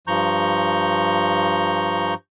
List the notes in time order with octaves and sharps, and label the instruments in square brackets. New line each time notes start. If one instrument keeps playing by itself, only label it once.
[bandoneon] G2 F3 A#5 C#6 G6